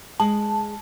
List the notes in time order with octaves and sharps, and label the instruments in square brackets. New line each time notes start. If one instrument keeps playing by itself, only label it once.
[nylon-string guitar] G#3 [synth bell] A5